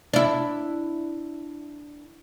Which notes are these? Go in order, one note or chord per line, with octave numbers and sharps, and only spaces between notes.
D4 E4